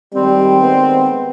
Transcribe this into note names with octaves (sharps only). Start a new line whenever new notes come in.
D#3 G3 G#3 C4
B3